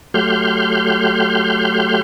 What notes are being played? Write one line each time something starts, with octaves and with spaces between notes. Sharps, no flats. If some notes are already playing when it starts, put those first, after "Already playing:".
F#3 A3 G4 C6 F6 G6